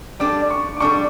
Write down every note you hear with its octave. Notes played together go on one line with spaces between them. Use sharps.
G3 D4 A4 D6
C#6
D6
G3 D4 A4 C#6